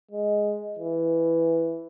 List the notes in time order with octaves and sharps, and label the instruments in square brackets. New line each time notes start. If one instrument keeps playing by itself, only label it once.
[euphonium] G#3
E3